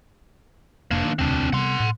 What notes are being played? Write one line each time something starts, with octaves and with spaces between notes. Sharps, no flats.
F1 A#3 D4
D#3
E1 D2 C3 C4 D4
C3 G3 B3 F#5 C6
A2